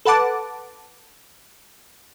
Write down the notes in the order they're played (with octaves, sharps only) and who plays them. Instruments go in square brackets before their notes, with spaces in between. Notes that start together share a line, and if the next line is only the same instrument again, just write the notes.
[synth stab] A4 B4 F#5 A5 D6